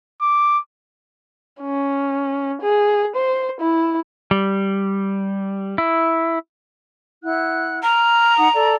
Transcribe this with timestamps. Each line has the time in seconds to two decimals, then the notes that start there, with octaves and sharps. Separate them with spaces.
0.21 D6
1.61 C#4
2.61 G#4
3.16 C5
3.60 E4
4.31 G3
5.78 E4
7.24 E4 F#5 F#6
7.83 A#5 F6
8.37 D#4 F#5 D#6
8.55 A4 D5